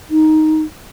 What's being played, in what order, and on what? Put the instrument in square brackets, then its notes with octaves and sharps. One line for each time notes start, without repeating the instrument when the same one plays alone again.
[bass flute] D#4